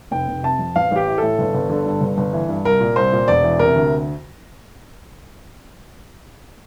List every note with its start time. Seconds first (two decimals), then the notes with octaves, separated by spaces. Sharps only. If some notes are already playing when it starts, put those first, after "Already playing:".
0.11 F1 G5
0.28 F1
0.43 C3 A5
0.59 F2
0.76 A1 F5
0.91 A1 G4
1.07 E3
1.18 A2 A4
1.39 G1
1.54 G1
1.69 D3
1.86 G2
2.01 G1
2.18 G1
2.33 E3
2.49 G2
2.65 C2 A#4
2.81 A#2
2.96 C2 C5
3.13 A#2
3.28 E1 D5
3.43 E3
3.59 C3 A#4
3.76 D2